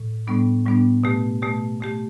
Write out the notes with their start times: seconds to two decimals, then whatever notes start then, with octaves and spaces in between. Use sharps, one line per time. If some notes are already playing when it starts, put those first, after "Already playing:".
Already playing: A2
0.27 A2 G3 B3 D4
0.66 A2 G3 B3 D4
1.04 B2 A3 G4
1.42 B2 A3 G4
1.81 B2 A3 G4